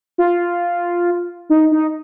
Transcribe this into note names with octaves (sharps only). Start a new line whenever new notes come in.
F4
D#4
D#4